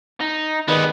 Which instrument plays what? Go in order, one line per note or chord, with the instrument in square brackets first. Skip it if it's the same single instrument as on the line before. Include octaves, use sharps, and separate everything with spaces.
[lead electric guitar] D#4
[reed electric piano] D#3 B4 [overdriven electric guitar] G3 G#3 [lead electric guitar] B3